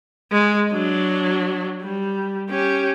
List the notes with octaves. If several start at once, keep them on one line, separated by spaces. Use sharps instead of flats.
G#3
F#3 D4
G3
C#4 G4